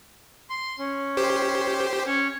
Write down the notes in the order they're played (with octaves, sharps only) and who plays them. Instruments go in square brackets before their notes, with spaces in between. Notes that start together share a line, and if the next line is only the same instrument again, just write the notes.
[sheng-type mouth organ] C6
C#4
[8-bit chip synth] G4 C5
[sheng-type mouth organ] C#4 C#5